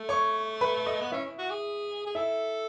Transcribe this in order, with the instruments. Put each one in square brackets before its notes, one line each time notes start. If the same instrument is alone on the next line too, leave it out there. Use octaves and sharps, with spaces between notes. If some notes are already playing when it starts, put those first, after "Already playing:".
Already playing: [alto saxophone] A3
[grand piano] C#5 C#6
B4 B5
D#5 D#6
[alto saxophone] B3
[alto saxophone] C#4 [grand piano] E4 E5
[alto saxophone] F#4
G#4
G#4
[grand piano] E4 E5 [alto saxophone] A4